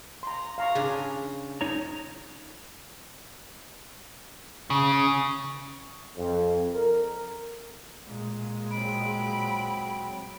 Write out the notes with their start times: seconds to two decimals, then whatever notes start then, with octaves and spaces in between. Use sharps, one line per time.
0.23 A#5 C6
0.58 F5 A#5 C#6
0.75 C#3 D4 G#4
1.61 D#4 C#5 A#5
4.70 C#3
6.17 F2
6.74 A#4
8.05 A#2 G#3
8.70 F#3 C4 B5 D7